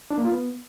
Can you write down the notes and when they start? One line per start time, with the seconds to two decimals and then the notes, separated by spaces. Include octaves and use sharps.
0.10 D4
0.18 A#3
0.25 F4
0.32 B3